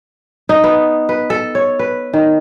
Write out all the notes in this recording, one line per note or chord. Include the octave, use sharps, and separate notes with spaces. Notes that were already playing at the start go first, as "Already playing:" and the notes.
D#4
B3
B4
A4
C#5
B4
D#3